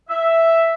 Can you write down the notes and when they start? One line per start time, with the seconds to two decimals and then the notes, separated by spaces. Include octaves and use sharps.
0.09 E5